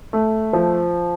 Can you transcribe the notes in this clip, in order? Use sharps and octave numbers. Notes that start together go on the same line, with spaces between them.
A3
F3